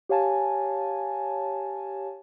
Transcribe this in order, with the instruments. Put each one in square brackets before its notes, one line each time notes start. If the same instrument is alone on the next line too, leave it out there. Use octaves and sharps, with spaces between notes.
[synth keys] G4 C#5 F5 G#5 A5